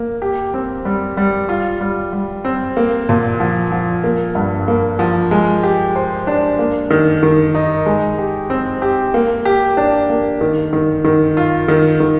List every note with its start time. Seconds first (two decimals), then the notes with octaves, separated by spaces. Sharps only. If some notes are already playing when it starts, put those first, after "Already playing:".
Already playing: A#3
0.22 G4
0.54 C4
0.85 G3
1.17 G3
1.49 F4
1.81 G3
2.13 G3
2.45 C4
2.77 A#3
3.09 A#2
3.40 F3
3.72 F3
4.04 A#3
4.35 G2
4.68 A#3
4.99 F3
5.31 G#3
5.63 G4
5.96 C5
6.27 D4
6.59 A#3
6.90 D#3
7.23 D#3
7.55 D#4
7.86 G#3
8.18 G4
8.50 C4
8.82 G4
9.14 A#3
9.45 G4
9.77 D4
10.09 A#3
10.41 D#3
10.73 D#3
11.04 D#3
11.37 F4
11.68 D#3
12.00 D#3